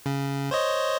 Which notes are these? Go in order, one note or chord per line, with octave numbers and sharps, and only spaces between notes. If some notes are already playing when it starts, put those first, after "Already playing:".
C#3
C5 C#5 D#5